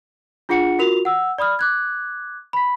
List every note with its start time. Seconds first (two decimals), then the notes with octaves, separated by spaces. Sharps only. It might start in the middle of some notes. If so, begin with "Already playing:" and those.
0.49 D4 F4 G#4 F#5 C#7
0.79 F4 F#4 A#4 F7
1.05 F#5 E6
1.38 D5 B5 D#6 F6
1.59 D6 F#6 G#6
2.53 B5 B6